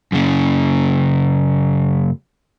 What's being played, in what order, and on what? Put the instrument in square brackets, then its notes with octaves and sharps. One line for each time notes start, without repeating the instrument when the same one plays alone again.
[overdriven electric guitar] F#2 C#3